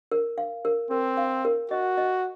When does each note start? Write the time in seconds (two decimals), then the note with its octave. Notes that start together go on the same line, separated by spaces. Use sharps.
0.11 A#4
0.38 F5
0.65 A#4
0.90 C4 A#4
1.17 F5
1.45 A#4
1.71 F#4 D#5
1.98 D#5